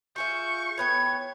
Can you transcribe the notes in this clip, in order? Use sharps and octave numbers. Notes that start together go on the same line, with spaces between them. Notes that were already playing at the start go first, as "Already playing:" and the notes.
F4 G#4 E5 C#6 G6
A2 B3 G5 G#6